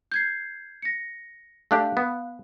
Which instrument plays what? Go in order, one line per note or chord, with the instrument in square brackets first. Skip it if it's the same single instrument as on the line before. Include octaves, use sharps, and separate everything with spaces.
[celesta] G6 G#6 C7
A#6 C#7
[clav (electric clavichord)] A3 D4 G4 [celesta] F5 F#6
[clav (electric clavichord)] B3